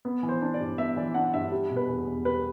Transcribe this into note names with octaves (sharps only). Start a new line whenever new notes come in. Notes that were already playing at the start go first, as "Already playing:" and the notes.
B3
E3
C5
D4
D5
G2
B3 E5
E3 D5
D4 F#5
G2 E5
G3
B2
B4
E2
E2
G3 B4